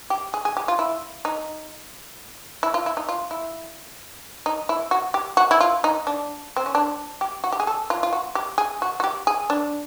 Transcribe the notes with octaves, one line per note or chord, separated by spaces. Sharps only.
G4
G#4
G#4
G4
F4
E4
D#4
E4
F4
E4
D#4
F4
E4
D#4
E4
F#4
G4
F#4
E4
F4
D#4
D4
C4
C#4
D4
G4
F#4
G4
G#4
A4
F4
F4
F#4
G4
G#4
F#4
F#4
G4
G#4
D4